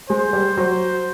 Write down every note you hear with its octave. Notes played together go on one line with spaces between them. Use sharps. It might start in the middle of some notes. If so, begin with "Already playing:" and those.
G#3 C5
G3
F#3 C5